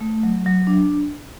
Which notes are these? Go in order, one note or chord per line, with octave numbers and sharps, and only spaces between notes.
A3
F#3
F#3
D4